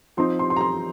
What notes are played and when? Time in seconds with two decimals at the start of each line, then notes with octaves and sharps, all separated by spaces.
0.17 F3 C4 D#4 C6
0.39 C6
0.50 C6
0.56 A#5
0.61 C6